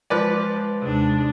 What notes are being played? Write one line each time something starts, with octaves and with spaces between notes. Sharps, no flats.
F3 G#3 B4 D5
D#2 C3 G#3 D4